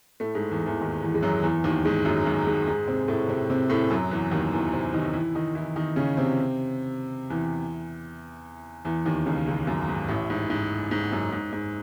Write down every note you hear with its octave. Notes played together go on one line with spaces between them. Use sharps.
A2 A3
G#2 G#3
E2 E3
E2 E3
D#2 D#3
E2 E3
G#3
F#2 F#3
E2 E3
D#2 D#3
G#2 G#3
F#2 F#3
F#2 F#3
G#2 G#3
G#2 G#3
C3 C4
A2 A3
C3 C4
C3 C4
A2 A3
F#2 F#3
E2 E3
D#2 D#3
E2 E3
C3 C4
D#3 D#4
E3 E4
D#3 D#4
E3 E4
D#3 D#4
C#3 C#4
C3 C4
E2 E3
E2 E3
D#2 D#3
C#2 C#3
C#2 C#3
F#2
G#2
A1 A2
G#2
G#2
G#2
F#2
G#2
G#2